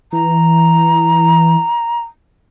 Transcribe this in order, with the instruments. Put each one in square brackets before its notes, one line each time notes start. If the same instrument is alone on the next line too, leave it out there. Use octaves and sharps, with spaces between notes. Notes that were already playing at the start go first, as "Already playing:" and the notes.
[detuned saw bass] E3 [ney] A#5